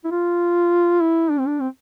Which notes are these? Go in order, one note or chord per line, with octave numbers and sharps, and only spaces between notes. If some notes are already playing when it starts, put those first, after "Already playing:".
E4
F4
E4
D4
C4
D4
C4